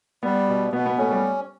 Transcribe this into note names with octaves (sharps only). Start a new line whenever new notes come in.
G3 B3
B2
B2 B3
B3
A3 C#4
G3